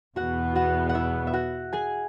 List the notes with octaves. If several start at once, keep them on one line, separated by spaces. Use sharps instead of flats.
E2 B2 B3 F#4 F#5
F#4 F#5
F#5
E4 E5
E5
F#4 F#5
G#4 G#5